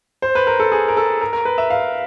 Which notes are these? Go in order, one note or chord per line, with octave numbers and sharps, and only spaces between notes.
C5
B4
A#4
A4
G#4
A#4
A4
A#4
A#4
B4
E5
F5